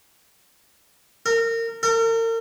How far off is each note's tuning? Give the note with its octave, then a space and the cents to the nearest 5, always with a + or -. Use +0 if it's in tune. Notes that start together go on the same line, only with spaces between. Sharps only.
A#4 -25
A#4 -40